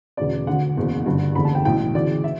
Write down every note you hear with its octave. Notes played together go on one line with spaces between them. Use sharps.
E1 D2 C#3 D5
D2 D3 F#5
F#1 E2 B2
G1 G2 D3
F#1 E2 D3 B5
A5
G5
B1 A2 E3 G5
D2 C#3 E3 D5
E5